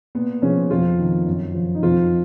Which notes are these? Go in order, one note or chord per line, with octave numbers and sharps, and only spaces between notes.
A#2 B3
C#3 F3 C#4
F2 F3 F4
D#3
F#2
F3
D#4
F2 F3 F4